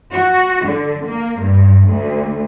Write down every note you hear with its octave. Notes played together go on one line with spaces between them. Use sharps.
F#4
D3
A#3
G2
D2